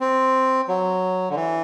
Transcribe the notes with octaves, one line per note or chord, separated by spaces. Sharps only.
C4
F#3
D3
E3